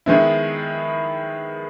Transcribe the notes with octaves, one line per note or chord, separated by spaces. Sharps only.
D#3 G#3 B3 E4